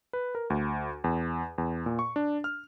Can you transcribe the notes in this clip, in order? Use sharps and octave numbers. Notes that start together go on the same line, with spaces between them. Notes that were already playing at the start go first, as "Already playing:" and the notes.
B4
A#4
D2
E2
E2
A#2
C#6
D4
F6